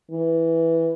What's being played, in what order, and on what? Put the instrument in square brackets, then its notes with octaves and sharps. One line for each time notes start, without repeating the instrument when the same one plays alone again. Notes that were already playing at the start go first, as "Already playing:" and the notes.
[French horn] E3